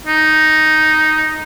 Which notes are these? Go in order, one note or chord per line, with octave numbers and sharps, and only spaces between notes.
D#4